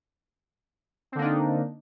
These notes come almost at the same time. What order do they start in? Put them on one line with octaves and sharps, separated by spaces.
C4 D3 A#3 D4 D#4